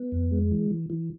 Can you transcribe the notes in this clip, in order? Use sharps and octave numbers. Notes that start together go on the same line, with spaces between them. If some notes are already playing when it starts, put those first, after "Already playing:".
Already playing: B3
F2
G#3
E3
E3
E3